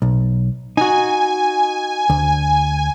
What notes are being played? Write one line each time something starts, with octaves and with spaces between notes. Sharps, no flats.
B1
D#4 F#4 G#5
D2